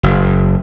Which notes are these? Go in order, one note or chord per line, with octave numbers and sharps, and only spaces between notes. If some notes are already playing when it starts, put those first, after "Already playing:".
F#1